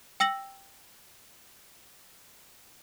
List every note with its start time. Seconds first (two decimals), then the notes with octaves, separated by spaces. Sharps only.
0.20 G5 E6 A#6 F#7